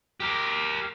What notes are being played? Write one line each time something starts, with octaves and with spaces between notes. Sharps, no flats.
G4 A#4